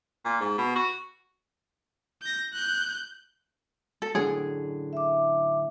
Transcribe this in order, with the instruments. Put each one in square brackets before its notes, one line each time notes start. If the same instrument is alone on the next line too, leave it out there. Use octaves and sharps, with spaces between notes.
[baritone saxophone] A#2
G#2
B2
F#4
[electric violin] G6 A#6
F#6 G6
[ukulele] A4
[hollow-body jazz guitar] F#2 A2 D3 [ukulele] G#4
[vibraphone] E5 D6